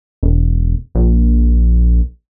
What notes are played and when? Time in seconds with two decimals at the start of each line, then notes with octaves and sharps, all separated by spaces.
0.23 E1
0.95 A#1